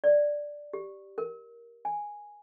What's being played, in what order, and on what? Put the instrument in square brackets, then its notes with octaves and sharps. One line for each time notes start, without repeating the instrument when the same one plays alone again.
[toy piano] D5
G4
A#4
G#5